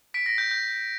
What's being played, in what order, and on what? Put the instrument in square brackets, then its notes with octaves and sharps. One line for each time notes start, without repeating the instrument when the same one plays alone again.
[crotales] B6 D7
A#6
G6
G6